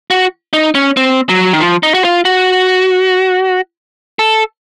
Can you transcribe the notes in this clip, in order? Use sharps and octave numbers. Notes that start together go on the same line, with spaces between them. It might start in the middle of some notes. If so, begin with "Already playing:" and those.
F#4
D#4
C#4
C4
F#3
D#3
F3
D#4
F#4
F4
F#4
A4